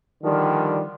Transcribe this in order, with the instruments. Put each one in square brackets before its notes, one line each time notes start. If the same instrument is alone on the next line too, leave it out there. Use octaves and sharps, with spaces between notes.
[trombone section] D3 D#3 F3 G3